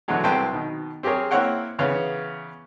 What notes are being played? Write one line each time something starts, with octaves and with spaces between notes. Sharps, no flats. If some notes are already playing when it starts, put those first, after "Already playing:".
E2 B2 D3 F#3 G#3
C2 F#3 C4 B4 G5 A5
B2 D#3
C4 G4 G#4 A#4 C#5
A#3 C4 E4 C#5 F#5 G5
E2 C#3 B3 C#5